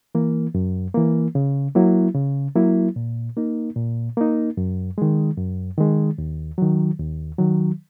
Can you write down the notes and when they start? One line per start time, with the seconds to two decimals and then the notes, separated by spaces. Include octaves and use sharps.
0.15 E3 A#3
0.55 F#2
0.94 E3 A#3
1.35 C#3
1.75 F#3 A#3 E4
2.15 C#3
2.56 F#3 A#3 E4
2.96 A#2
3.37 A#3 D#4
3.76 A#2
4.17 A#3 D#4
4.57 F#2
4.98 D#3 G#3
5.38 F#2
5.77 D#3 G#3
6.18 D#2
6.58 D#3 F#3
6.99 D#2
7.38 D#3 F#3